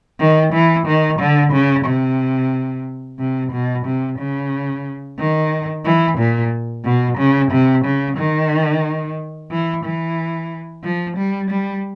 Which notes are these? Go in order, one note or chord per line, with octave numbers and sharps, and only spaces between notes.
D#3
E3
D#3
D3
C#3
C3
C3
B2
C3
C#3
D#3
E3
A#2
B2
C#3
C3
C#3
D#3
E3
E3
F3
G3
G3